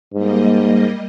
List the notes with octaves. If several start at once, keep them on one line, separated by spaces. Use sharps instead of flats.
G#2 G3 A#3 D#5